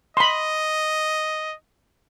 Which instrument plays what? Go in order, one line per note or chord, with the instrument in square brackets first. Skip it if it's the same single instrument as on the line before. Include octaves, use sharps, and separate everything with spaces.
[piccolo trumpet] D#5 [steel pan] B5 C6